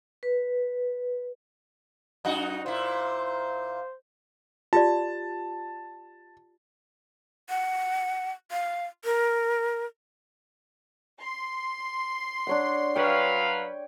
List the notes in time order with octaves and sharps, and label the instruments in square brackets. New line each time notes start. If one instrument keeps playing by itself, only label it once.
[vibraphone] B4
[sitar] F#2 D#4 F#4
[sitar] A#2 E4 [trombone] C5
[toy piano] F4 G4 D5 [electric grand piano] A5
[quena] F#5
F5
A#4
[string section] C6
[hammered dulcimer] D4 C#5 F#5
[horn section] F#3 B4 F5 [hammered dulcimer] C#5 G5